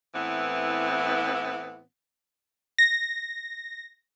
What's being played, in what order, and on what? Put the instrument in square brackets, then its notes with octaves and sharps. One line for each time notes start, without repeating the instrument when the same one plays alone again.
[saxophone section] A2 E3 B3 C4 E4
[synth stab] A#6